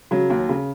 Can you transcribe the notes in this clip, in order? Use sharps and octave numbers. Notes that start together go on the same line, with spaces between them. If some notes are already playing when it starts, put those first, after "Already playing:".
C#3 F#3
D#2
C#3